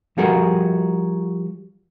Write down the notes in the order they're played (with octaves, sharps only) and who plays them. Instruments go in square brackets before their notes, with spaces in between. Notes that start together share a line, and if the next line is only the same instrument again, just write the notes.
[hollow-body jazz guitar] F3 G3 F#4 G#4 A#4